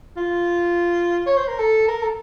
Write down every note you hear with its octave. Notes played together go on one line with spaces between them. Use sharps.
F4
C#5
C5
A#4
A4
A#4
A4